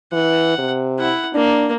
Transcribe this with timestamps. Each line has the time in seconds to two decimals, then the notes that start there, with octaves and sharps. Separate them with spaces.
0.13 E3 F#5
0.58 C3
0.99 E4 F#5
1.34 A#3 D4